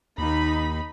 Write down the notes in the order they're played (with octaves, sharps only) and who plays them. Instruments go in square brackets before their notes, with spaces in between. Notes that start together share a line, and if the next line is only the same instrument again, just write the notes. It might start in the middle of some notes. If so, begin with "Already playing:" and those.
[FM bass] D#2 [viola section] D#4 B5